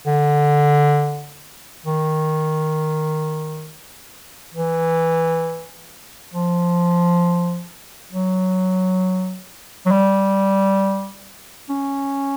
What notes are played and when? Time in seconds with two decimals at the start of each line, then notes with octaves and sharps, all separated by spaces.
0.07 D3
1.86 D#3
4.54 E3
6.33 F3
8.11 F#3
9.86 F#3
9.91 G3
11.69 C#4